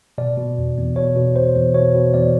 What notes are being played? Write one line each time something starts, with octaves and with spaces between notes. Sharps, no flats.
B2 D5
B2
E2
E2
B2 C#5
B2
E2 C5
E2
B2 C#5
B2
E2 D5